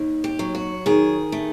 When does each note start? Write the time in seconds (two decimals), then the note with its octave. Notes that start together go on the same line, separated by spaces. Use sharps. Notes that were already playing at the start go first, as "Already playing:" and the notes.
Already playing: D#2
0.24 G4
0.39 F#3
0.55 F#4
0.86 D#3 G#4
1.32 A3